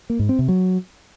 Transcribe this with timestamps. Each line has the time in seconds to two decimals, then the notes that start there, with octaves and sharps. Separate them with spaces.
0.10 A#3
0.19 G#2
0.29 C4
0.39 C3
0.48 F#3